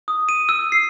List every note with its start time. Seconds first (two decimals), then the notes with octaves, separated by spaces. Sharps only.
0.08 D#6
0.29 D#7
0.49 E6
0.72 C7